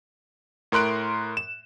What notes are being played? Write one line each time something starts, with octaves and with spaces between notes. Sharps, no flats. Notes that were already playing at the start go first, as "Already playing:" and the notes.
A2 A#4 C6 F#6 D7
E7